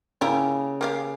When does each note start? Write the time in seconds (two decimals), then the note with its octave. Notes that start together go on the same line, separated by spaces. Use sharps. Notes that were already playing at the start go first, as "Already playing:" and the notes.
0.21 C#3 E4 G4 A#4
0.81 A#3 G4 F5